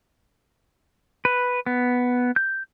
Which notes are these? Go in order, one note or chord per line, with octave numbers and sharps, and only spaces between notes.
B4
B3
G6